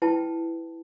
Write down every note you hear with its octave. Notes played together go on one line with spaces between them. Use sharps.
E4 B4 G5 A5